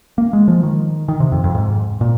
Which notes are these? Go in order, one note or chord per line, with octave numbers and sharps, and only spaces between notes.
A#3
G#3
F3
D#3
D#3
C3
F2
F2
G#2
A#2